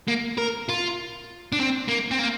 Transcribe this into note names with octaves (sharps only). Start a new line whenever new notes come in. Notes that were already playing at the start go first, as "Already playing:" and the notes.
A#3
A#4
F4
D4
C4
A#3
C4
A#3